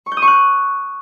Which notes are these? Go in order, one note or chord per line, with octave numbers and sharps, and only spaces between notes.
C#6
G6
D#6
C#6
F#6